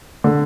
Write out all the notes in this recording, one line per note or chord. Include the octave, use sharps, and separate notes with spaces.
D3